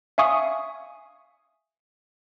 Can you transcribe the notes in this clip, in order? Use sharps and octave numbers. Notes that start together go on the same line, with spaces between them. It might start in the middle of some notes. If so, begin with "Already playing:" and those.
E5 F5 G#5 C#6 D#6